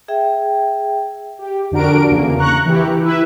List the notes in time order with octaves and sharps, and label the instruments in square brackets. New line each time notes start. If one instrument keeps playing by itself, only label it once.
[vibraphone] G#4 E5 G5
[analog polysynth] G4
F2 D3 D4 F#4 A#4 D7
E2 C#3 A#3
A#5 C#6 F#6
E3 E4 G4
E4 B4 E5